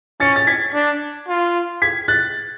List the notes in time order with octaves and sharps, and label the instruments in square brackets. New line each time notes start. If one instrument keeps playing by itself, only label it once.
[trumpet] C#4 [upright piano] A6 C#7
[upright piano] A6
G#6 B6
[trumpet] D4
F4
[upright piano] G#6 B6
F#6 A6